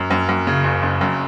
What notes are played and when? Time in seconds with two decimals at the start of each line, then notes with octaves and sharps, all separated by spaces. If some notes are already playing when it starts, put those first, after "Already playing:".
Already playing: F#2
0.10 F#2
0.28 F#2
0.47 C#3
0.64 F#1
0.82 F#1
1.01 F#2